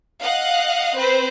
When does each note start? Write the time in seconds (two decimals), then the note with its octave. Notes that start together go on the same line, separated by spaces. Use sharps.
0.20 D#5 F5 F#5 F#6
0.97 C4 B4 C5